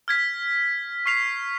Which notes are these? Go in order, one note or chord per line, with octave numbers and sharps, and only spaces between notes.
F6 G#6 B6
C#6 F6 C7 F7